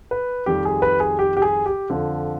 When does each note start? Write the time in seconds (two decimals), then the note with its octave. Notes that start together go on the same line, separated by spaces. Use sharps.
0.11 B4
0.46 F2 D#3 G3 G4
0.65 G#4
0.82 B4
1.00 G#4
1.19 G4
1.37 G4
1.42 G#4
1.66 G4
1.90 F2 D3 F3